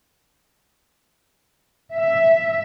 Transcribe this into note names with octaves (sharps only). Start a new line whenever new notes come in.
E5